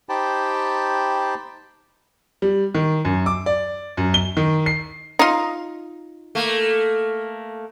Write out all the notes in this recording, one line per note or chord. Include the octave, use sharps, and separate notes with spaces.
D#4 G4 C5 G5 A5 B5
G3
D#3
F#2
D6
D5
F#2
G7
D#3
C7
D#4 F4
A3 A#3